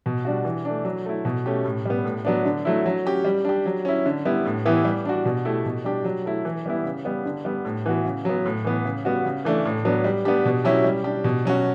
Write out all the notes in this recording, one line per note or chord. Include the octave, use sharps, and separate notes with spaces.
B2
G3 D4 F#4
E3
A3 D4
F#3
A3 E4
B2
A3 C#4 G4
A2
G3 B3
A2
F#3 B3 D4
D3
F#3 A3 E4
F#3
C#4 G4
G3
D4 G4
F#3
C#4 E4
D3
G3 B3 E4
A2
E3 B3 E4 G4
G3
D4 F#4
B2
A3 E4 G4
B2
G3 D4 G4
F#3
A3 E4
E3
G3 B3 E4
C#3
G3 B3
D3
G3 B3
A2
E3 B3 F#4
C#3
F#3 B3
A2
E3 B3
C#3
G3 B3 F#4
C#3
E3 A3 D4
A2
F#3 B3 D4
G3
B3 D4 G4
B2
F#3 C#4 E4 G4
G3
D4 G4
B2
F#3 C#4 F#4